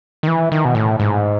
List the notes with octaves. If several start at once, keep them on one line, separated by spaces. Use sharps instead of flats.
D#3
E3
D#3
B2
A2
G#2